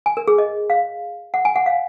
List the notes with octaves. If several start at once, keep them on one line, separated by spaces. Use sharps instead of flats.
G#5
A#4
G#4
D#5
F5
F#5
G#5
F#5
F5